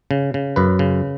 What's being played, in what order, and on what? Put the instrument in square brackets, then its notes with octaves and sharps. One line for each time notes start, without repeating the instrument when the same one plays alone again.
[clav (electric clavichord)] C#3
C#3
F#2 B4
C#3